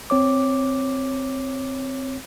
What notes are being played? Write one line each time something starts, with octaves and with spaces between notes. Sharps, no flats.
C4 C#5 D6